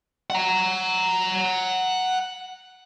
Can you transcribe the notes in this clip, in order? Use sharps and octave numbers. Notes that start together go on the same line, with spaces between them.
F#5 A#5